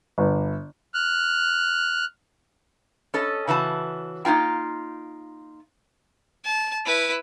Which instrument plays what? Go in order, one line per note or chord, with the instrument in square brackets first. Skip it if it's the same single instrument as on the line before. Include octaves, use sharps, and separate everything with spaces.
[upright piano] G1
[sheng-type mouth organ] F6 F#6
[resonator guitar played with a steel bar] C#4 A4 D#5
C#3 E3 F#4 A5
A#3 D#4 F4 G5
[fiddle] A5
E4 B4